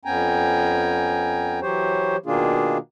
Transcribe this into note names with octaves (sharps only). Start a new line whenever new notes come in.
F2 B3 C#4 G5 G#5 A#5
E3 F#3 G4 C5 C#5
B2 D#3 A#3 D4 F4 G#4